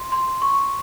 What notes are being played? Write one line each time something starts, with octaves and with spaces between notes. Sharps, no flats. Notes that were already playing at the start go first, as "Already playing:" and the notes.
Already playing: C6
C6
C#6